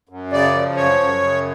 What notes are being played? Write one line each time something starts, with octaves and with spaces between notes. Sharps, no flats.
F#2
C#3 D5
F3
F#2 C#5
F#2
C#3